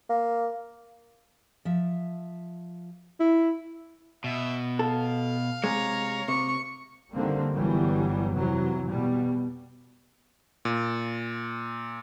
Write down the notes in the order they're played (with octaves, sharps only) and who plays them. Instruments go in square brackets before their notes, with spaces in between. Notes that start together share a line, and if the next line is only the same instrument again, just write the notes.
[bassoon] A#3
[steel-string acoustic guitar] F3 E5
[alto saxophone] E4
[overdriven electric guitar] B2 [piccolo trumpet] E5
[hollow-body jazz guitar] A4 [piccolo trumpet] F5
[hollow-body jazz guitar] C3 G#3 [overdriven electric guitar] C#5 [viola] A#5
[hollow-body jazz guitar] C3 [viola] C#6
[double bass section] D3 D#3 G3 A#3 C4
G1 E3 F#3 G3
F2 C3 E3 F#3
B2 G3
[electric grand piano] A#2